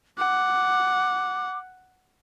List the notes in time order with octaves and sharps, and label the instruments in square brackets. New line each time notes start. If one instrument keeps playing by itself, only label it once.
[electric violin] F#5 [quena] D6